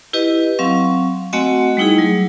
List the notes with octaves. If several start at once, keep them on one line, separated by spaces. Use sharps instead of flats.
E4 G4 B4 D#5
F#3 C4 F5 C#6
A3 C4 F#4 D#5 F#5 G#5
G3 A3 D#4 E4 G#4
F#3